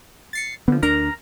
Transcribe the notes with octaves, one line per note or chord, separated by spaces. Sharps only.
A6 C7 C#7
D3 F3 B3
D2 D4 A#4 A#5